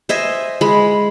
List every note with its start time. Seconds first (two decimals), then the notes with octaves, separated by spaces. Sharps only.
0.09 C5 D#5 E5 G#5
0.61 G#3 B5